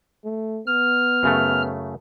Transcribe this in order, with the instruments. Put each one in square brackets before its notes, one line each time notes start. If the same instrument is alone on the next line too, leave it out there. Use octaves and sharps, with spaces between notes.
[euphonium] A3
[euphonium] B3 [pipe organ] F6
[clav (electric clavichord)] F#2 C#3 A3